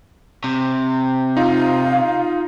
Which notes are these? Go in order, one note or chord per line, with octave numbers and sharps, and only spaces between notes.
C3
D#4 F4 F5